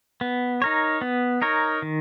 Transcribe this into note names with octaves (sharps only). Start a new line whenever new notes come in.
B3
D#4 A#4 C#5
B3
D#4 A#4 C#5
D#3